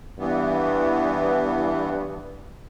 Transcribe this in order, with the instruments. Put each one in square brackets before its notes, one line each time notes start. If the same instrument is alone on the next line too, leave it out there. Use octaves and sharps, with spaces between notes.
[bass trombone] G2 [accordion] E3 B3